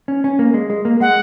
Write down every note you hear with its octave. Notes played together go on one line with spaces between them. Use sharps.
C#4
C#4
A#3
G#3
G#3
A#3
G#3 F#5